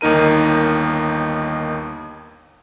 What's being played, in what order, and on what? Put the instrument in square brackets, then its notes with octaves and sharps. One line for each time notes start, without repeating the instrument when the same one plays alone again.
[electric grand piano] G1 D#2 D#4 A#4 D#7